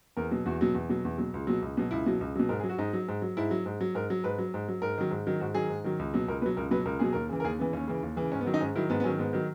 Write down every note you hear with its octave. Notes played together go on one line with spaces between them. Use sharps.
E2 A#4
B2 F#3
E2 F#4
B2 F#3
E2
B2 F#3
E2
B2 F#3
C#2
B2 F#3
C#2
B2 F#3
C#2 E4
B2 F#3
C#2
B2 F#3
G#2 A#4
G#4
F#3
F#4
G#2 D#4
F#3
G#2
F#3
G#2 E4
F#3
G#2
F#3
G#2 A#4
F#3
G#2 B4
F#3
G#2
F#3
G#2 A#4
D#3 F#3
G#2
D#3 F#3
G#2 F#4
D#3 F#3 G#4
G#2
D#3 F#3
C#2
B2 F#3
C#2 A#4
B2 F#3 B4
C#2 A#4
B2 F#3 B4
C#2 A#4
B2 F#3 G#4
D#2 A#4
C#3 E3
A#4
D#2 G#4
C#3 E3 B3
D#2 C#4
C#3 E3
D#2
C#3 E3
G#2 C#4
B3
D#3 F#3
D#4
G#2 C#4
D#3 F#3 E4
G#2 B3
B3
D#3 F#3 C#4
G#2 B3
D#3 F#3